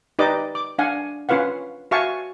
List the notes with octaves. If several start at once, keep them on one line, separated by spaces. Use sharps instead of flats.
D#4 G4 B4 D5 D#5 D6
D6
D4 F5 F#5 G#5
C#4 F4 B4 F5 F#5
F#4 E5 F5 G#5 A5 C#6